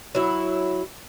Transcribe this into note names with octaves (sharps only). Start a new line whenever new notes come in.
F#3 E4